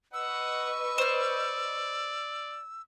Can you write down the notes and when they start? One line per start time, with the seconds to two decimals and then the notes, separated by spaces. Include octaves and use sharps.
0.14 B4 D#5 F#5 C#6 E6
0.98 C5 D5 F6